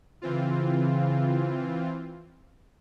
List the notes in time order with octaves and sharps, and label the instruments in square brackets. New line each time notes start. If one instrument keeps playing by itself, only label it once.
[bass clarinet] C#3 [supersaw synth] E3 C4 F4